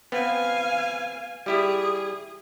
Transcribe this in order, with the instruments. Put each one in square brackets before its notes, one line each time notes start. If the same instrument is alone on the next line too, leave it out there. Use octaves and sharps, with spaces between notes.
[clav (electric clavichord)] B3 C4 [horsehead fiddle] F5 G#5
[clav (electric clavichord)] G3 E4 G4 [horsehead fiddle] G#4